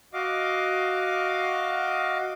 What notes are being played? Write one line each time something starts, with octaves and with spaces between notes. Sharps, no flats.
F#4 D#5 F5 D6